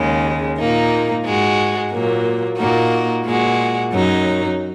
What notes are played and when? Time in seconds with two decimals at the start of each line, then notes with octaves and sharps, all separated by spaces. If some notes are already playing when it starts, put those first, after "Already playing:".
Already playing: D#2 C#3 G#3
0.57 A#2 A#3 D#4
1.24 G#2 G#3 F#4
1.91 A#2 F#3 A#3
2.57 A#2 A#3 D#4 F#4
3.24 A#2 G#3 F#4
3.91 F#2 F#3 D#4